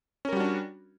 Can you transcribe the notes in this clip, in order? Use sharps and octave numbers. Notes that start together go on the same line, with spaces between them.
G3 C#4 D4 F#4 A#4